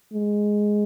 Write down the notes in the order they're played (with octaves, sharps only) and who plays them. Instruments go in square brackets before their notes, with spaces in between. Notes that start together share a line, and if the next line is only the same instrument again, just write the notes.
[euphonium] G#3